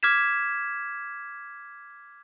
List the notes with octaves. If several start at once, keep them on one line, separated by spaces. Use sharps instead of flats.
D6 F6 G#6 B6 E7